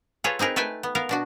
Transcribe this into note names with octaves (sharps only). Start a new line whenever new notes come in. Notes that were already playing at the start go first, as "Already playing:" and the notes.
F4 G#4 A4 B4 C#5
C4 D#4 G#4 A#4 B4
A3 A4 B4 G5 G#5
B3
B3 A#4 F5
B2 D4 F#4